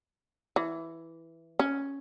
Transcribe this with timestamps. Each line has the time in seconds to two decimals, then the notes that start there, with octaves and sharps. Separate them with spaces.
0.56 E3
1.59 C#4